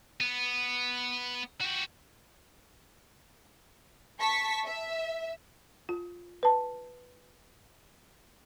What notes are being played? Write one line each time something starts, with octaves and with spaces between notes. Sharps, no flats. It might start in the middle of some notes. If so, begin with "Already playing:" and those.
B3
F#4 G4
A5 C#6 B6
E5
F4
B4 A5